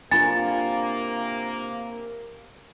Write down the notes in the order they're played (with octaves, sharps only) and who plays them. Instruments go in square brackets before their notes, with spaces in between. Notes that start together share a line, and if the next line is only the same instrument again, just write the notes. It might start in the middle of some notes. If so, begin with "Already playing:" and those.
[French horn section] C3 A#3 [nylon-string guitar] D4 F4 A#4 [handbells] G#5 B5 [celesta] A6